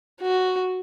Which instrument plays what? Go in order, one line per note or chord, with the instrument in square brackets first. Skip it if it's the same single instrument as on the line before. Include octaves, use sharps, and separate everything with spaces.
[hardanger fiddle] F#4